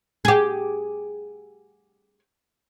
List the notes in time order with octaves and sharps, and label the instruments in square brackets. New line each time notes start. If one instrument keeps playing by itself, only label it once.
[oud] G4 G#4